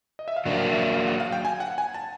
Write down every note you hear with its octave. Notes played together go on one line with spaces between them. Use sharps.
D#5
E5
F5
F#3 A#3 D4 F#5
F5
E5
E5
F5
F#5
F5
G5
G#5
F#5
G#5
A5